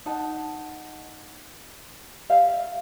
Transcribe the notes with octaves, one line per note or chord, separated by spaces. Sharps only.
D#4 F#5 A5
G4 E5 F5